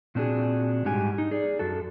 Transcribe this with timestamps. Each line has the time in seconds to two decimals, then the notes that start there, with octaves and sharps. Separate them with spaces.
0.15 A#2 C4 D4 F#4 G#4
0.85 G#2 G3 G4 F#5 G#5
1.18 D#4
1.31 G#4 D5
1.59 F#2 F#4 A4